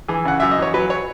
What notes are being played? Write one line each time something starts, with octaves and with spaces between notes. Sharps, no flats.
E3 G#4
C#3 F#5
F#2 E5
D#5
E3 C#5
F#3 B4
C#5